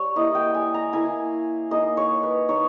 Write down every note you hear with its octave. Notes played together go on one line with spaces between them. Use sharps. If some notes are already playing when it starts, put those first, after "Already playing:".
Already playing: G3 C#5
A#3 E4 D#5
G5
G#5
A#5
A#3 E4 G#5
A#3 D#4 D#5
C#5
B4
A#3 D#4 C#5